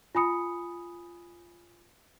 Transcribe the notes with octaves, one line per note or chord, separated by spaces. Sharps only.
F4 G#5 B5 D#6 C#7